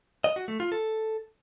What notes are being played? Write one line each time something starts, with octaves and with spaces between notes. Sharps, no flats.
D#5
F#4
A3
F4
A4